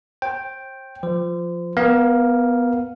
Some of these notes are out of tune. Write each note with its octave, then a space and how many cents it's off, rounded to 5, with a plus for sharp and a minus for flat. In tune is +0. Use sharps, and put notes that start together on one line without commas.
C5 +35 G5 +0
F3 +0 C5 -30
B3 +0 A#4 +25 F5 +0